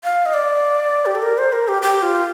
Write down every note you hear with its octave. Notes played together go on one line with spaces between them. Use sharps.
F5
D#5
D5
G4
A4
A#4
C5
A#4
G4
G4
F4